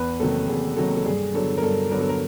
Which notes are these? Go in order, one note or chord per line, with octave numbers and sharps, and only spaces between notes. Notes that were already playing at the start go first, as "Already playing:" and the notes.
Already playing: E2 B4
C3 D#3 F#3 A#3 A4
E2 G#4
C3 D#3 F#3 A#3 A4
A4
G2 G#4
D3 F#3 B3 A4
A#4
G2 A4
D3 F#3 B3 A#4
A4
A#4